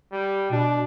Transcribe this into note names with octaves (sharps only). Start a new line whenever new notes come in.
G3
B2 D4